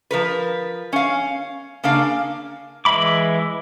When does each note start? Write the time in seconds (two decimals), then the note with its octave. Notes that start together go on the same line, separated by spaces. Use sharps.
0.11 F3 A#4 B4
0.93 C#4 F5
1.84 C#3 A#3 D4 A#4 F5
2.85 E3 G#3 E5 B5 D6